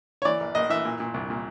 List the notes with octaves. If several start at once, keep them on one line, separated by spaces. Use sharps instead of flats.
C#5
E3 D5
A#1
A#1 D#5
E3 E5
A#2
A#2
C2
A#2